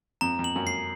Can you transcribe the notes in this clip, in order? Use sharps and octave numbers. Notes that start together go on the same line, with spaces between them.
F2 A#5
F2
F#7
F#2
C7